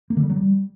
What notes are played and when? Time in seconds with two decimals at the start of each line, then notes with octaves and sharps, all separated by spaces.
0.10 A#3
0.17 D3
0.23 G3
0.30 F#3
0.36 G3